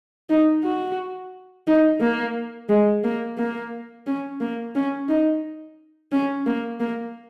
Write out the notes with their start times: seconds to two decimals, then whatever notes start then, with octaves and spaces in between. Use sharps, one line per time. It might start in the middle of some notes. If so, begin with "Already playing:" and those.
0.29 D#4
0.64 F#4
1.67 D#4
2.00 A#3
2.69 G#3
3.04 A#3
3.38 A#3
4.07 C#4
4.41 A#3
4.75 C#4
5.09 D#4
6.12 C#4
6.46 A#3
6.80 A#3